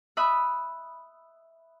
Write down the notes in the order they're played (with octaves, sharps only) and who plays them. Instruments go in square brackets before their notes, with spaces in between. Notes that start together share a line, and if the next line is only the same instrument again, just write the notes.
[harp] E5 B5 D#6 F#6